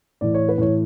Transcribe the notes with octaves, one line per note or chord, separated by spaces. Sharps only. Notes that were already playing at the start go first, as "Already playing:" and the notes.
A2 E3 D5
C#5
B4
A2 E3 C#5